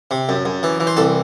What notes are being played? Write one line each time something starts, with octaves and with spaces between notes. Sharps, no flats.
C3
F#2
F#2
E3
E3
C5
C2 A4